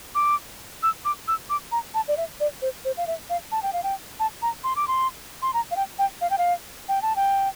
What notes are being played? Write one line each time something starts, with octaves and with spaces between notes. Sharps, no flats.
D6
E6
D6
E6
D6
A#5
A5
D5
E5
D5
C5
C5
F5
E5
F5
A5
G5
F5
G5
A5
A#5
C6
D6
C6
C6
A#5
F5
G5
G5
F5
G5
F5
G5
A5
G5